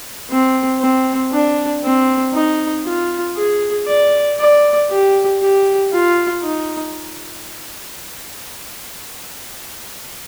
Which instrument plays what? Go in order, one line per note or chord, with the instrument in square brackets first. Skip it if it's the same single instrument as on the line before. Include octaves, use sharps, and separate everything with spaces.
[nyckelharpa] C4
C4
D4
C4
D#4
F4
G#4
D5
D5
G4
G4
F4
D#4